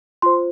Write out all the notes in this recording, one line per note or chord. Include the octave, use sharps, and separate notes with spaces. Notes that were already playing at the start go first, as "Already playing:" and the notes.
F4 C5 C6